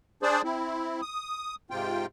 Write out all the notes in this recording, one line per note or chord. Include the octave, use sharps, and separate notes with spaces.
D4 G#4 C5 D5
C4 E4
D#6
G#2 C3 F4 G5